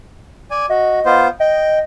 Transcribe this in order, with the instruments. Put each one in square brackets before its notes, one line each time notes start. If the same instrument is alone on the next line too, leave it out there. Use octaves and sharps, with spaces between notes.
[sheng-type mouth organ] D5 G#5
[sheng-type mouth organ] F#4 [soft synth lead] D#5
[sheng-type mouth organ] B3 F4 C5
[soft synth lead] D#5 [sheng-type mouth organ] G5